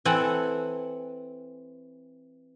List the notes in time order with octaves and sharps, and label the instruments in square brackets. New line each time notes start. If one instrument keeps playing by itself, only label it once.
[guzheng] E3 C4 A4 F#5 G#5